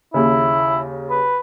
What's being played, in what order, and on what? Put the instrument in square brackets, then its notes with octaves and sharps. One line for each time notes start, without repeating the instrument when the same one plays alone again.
[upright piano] D#2 C#3 [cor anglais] E4
[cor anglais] B4